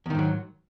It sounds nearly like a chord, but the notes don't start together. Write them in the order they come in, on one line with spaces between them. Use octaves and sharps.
E2 D#3 G#2 F#3